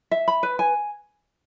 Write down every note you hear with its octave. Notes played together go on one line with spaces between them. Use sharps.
E5
B5
B4
G#5